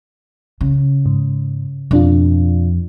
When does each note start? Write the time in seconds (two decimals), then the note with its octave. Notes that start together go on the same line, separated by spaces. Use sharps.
0.61 C#3
1.06 G#2
1.91 F2 B2 D4 F4